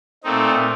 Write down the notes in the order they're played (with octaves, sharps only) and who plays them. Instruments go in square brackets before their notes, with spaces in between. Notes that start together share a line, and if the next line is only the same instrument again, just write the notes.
[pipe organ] A#2 A3 C4 D#4